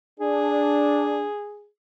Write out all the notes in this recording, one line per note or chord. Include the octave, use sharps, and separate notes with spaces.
D4 G#4